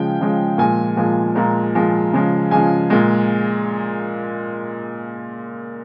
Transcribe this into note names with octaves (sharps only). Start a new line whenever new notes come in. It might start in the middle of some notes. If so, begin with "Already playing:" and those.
Already playing: C#3 F3 G#3 G5
C#3 F3 G#3
A#2 F3 G#3 G#5
A#2 F3 G#3
A#2 F3 G#3 A#5
A#2 F3 G#3
C#3 F3 G#3
C#3 F3 G#3 G#5
A#2 G#3